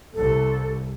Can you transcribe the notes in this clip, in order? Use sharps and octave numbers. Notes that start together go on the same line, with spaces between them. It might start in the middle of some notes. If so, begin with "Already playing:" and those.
C2 A4